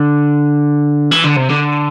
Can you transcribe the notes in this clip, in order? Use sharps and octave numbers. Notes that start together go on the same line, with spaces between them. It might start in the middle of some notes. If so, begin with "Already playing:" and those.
Already playing: D3
E3
D3
C3
D3